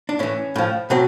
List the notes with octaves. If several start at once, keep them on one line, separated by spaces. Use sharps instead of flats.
D4
A2 E3 C#4
A2 F3
B2 F#3 C4